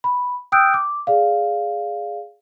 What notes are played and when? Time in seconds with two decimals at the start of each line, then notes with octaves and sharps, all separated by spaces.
0.04 B5
0.52 G5 D#6 E6 F#6 G6 D7
0.74 D6
1.07 G#4 D5 F5